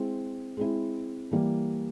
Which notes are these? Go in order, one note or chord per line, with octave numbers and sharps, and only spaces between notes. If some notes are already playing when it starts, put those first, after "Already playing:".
Already playing: G#3 C4 E4
G#3 C4 E4
E3 G3 A#3